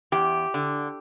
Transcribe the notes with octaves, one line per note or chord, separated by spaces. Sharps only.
E2 G4
D3